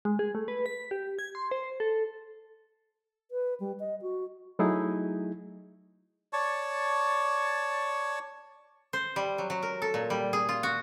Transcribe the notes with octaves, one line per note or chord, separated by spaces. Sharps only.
G#3
G#4
A3
B4
B6
G4
G#6
C6
C5
A4
B4
G3
D#5
F#4
F#3 A3 D#4 E4 G#4
C#5 D5 A5 C#6
C5
G3
F#3
F#3
A#4
A4
A#2
G3
G#4
F4
F#4